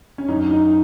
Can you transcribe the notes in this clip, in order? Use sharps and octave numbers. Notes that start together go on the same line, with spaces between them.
C#4
F#2 D#4
D#4